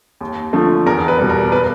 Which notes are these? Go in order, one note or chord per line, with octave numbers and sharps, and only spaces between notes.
D#2
D3 F3 A3
E2 A#4
B4
B2 G3
A#4
B4